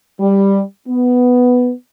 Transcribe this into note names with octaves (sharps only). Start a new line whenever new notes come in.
G3
B3